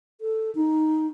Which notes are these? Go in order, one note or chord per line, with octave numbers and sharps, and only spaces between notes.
A4
D#4